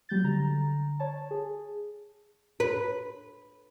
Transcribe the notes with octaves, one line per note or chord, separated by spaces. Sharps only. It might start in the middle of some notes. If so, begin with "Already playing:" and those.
F#3 G3 G6 A6
D3 A#5
C#5 A5
G#4
B4